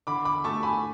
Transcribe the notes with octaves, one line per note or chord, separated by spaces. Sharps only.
D3 B5 D6
B5 D6
A3 A5 C#6
G#5 B5